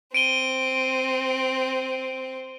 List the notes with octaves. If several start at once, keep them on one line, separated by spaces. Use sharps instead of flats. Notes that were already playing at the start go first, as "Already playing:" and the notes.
C4 D7 D#7 G7